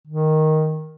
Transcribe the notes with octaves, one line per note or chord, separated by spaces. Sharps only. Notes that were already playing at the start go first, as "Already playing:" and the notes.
D#3